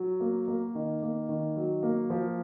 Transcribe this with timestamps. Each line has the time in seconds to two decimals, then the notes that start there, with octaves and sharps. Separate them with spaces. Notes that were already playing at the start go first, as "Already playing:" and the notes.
Already playing: F#3
0.20 A#3
0.48 A#3
0.75 D#3
1.02 A#3
1.29 D#3
1.56 F#3
1.83 A#3
2.10 F3